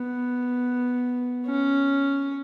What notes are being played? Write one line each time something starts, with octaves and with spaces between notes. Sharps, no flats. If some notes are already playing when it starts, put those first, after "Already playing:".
Already playing: B3
C#4